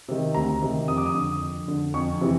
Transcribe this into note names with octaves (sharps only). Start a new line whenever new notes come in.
C3 D#3
D2 A#5
C3 D#3
F2 D#6
D6
D#6
D3
F2
D3
F2 C#6
C3 E3